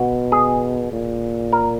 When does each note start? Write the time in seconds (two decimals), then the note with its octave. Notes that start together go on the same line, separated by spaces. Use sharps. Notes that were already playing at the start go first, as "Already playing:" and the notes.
Already playing: B2 F#4
0.32 G#4
0.92 A#2
1.52 A#4